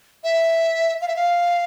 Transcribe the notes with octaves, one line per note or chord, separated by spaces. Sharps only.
E5
F5
E5
F5